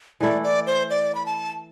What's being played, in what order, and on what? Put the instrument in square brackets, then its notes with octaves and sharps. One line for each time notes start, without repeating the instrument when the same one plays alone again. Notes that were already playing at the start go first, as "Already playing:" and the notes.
[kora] E3 A3 E4 [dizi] D5
[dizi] D5
C5
D5
B5
A5